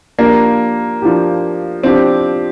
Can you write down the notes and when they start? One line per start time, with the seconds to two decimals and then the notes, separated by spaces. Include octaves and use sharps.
0.18 F3 A#3 D4 G4
1.02 F3 D4 G4
1.83 F3 C4 D4 G4